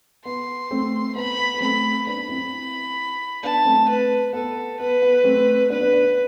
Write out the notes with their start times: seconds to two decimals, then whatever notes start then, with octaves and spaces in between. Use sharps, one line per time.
0.25 B3 C6
0.71 A3 C4
1.15 B3 B5
1.38 B3
1.54 B3
1.61 A3 C4 B5
2.07 B3 D4 B5
2.29 C4 E4
3.42 B3 D4 A5
3.65 A3 C4
3.89 B4
4.33 B3 A4
4.79 B3 B4
5.02 B3
5.24 A3 C4
5.70 B3 D4 B4
5.81 B3 D4
5.93 B3 D4